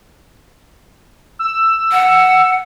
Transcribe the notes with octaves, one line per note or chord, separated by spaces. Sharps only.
E6
F#5